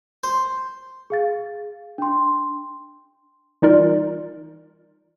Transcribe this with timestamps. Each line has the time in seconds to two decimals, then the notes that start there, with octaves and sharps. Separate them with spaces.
0.24 C5
1.10 G#4 F5 A6
1.98 D4 C6
3.62 E3 G3 D#4 F4 A#4 D5